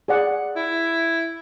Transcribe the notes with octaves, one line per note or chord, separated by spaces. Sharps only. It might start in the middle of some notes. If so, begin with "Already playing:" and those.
G#4 D5 F#5
E4